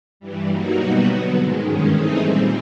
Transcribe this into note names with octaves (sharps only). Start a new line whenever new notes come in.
G2 E3 G3
F#3 A#3 D#4 F#4
B2 G3 B3 D#4 F#4
D3 F#3 B3
G#2 D#3 G#3
G2 D#3 G#3 C#4
E3 A3 C4 D#4 G#4
A#2 G3 C4